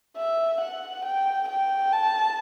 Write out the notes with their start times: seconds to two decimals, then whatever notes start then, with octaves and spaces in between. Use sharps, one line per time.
0.17 E5
0.61 F#5
1.05 G5
1.48 G5
1.92 A5